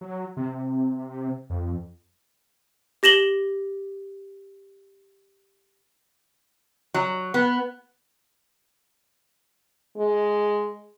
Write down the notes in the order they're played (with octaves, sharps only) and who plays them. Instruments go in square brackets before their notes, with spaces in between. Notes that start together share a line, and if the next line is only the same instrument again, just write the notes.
[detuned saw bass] F#3
C3
F2
[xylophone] G4 A#6 E7 F#7 G7
[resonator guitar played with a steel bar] F#3
B3
[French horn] G#3